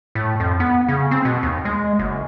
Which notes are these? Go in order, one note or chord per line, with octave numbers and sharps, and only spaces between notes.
A2
F2
B3
C#3
C4
B2
D#2
G#3
F#1